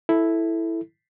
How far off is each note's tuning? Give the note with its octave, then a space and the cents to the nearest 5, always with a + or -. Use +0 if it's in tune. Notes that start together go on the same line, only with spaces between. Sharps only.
E4 +0 A4 +0